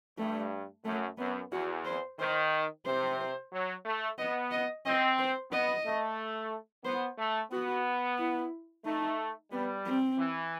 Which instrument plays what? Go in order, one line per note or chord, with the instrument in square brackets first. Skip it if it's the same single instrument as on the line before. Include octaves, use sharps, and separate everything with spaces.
[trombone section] G2 [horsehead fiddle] A3
[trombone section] F#2 [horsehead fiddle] A3
[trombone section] F#2 [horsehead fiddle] B3
[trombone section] E2 [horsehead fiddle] F#4
[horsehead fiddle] C5
[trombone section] D#3 [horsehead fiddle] C5
[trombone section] C3 [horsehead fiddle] C5
[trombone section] F#3
A3
[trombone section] B3 [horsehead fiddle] D#5
[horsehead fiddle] D#5
[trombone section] C4 [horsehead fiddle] D#5
[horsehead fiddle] C5
[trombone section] B3 [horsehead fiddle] D#5
[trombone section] A3
[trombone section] B3 [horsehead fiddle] C5
[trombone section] A3
[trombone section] B3 [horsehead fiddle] F#4
[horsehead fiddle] E4
[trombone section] A3 [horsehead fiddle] D#4
[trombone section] G3 [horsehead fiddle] B3
[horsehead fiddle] C4
[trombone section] E3